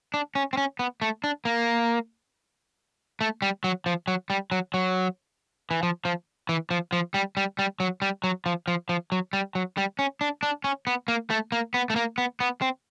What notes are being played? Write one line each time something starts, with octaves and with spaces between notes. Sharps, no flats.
D4
C#4
C4
C#4
B3
A3
D4
A#3
A3
G3
F#3
F3
F#3
G3
F#3
F#3
E3
F3
F3
E3
F3
F3
G3
G3
G3
F#3
G3
F#3
F3
F3
F3
F#3
G3
F#3
G3
C#4
D4
D4
C#4
B3
A#3
A3
A#3
B3
A3
A#3
B3
B3
C4